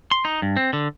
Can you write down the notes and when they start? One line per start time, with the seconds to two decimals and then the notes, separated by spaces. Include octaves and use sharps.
0.11 C6
0.25 D#4
0.42 G2
0.57 C4
0.73 D3